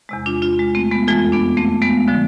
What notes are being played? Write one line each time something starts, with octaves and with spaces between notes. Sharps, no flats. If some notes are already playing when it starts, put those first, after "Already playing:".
E2 C3 G#3
D4 F4
D4 F4
G#3
A3 C4
G#3 B3
F2 E3 G#3 F4 A4
B3 D4
A3 C4
G#3 B3
D3 F3 G#3